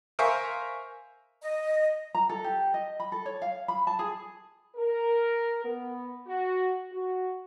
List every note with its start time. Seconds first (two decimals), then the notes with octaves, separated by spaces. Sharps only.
0.19 A#4 C5 E5 F5 G#5 C#6
1.42 D#5
2.15 A#5
2.29 A4
2.44 G4
2.74 D#5
3.00 B5
3.12 A4
3.26 C#5
3.42 F5
3.68 B5
3.87 A5
3.99 G#4
4.76 A#4
5.64 B3
6.27 F#4
6.91 F#4